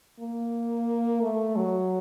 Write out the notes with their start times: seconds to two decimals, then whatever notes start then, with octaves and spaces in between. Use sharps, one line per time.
0.20 A#3
1.22 A3
1.56 F#3